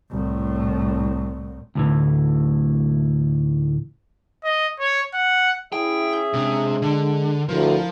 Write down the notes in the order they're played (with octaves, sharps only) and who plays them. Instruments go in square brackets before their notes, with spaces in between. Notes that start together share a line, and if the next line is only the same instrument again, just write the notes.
[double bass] C2 A2
[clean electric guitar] D2 A2 E3
[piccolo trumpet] D#5
C#5
F#5
[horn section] C#4 G#4 E5 [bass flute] E4 [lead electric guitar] G5
[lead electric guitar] C3 [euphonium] G#3 [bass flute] D4
[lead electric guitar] D3
[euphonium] D2 [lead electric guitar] F3 [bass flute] E4 [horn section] A#4